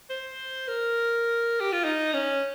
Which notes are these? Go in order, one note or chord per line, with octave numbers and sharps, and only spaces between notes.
C5
A#4
G4
F4
D#4
C#4